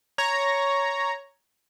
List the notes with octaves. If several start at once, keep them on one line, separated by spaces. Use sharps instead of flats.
C#5 A#5